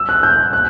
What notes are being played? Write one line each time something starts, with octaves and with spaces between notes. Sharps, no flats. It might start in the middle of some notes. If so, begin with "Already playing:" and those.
Already playing: E6
F#6
G6
F#6